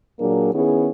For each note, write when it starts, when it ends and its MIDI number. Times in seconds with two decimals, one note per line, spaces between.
0.20 0.53 46
0.20 0.53 54
0.20 0.53 58
0.20 0.53 62
0.20 0.53 68
0.20 0.53 70
0.54 0.90 51
0.54 0.90 59
0.54 0.90 61
0.54 0.90 64
0.54 0.90 68